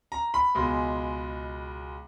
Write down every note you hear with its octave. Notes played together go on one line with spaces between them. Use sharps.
A#5
B5
C#2 B2 G#3